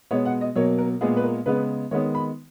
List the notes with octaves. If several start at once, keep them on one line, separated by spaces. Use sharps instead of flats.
B2 G#3 B3 C#5
F#5
D#5
B2 F#3 A#3 C#5
A#4
A#2 G#3 B3 G#4
B4
A#4
C#3 G#3 B3 B4
D#3 G#3 B3 C#5
B5